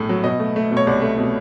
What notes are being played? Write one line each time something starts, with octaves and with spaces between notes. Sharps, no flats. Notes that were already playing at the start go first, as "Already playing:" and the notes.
Already playing: A#1 A2 A3
F#3
B2 D#5
A3
A3
B2
C#5
C2 D5
A3
B2